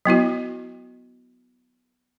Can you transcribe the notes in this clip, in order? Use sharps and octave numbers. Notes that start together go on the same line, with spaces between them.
F#3 B3 E4 F#4